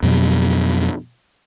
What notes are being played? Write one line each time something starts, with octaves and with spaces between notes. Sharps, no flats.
F2 B2 F#3